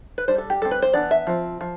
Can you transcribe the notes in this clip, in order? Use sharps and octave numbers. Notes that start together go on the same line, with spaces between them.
B4
G3 D4 C5
A4
G4
G3 C4 A4
B4
C5
E3 B3 D4 D5
E5
F3 C4
F3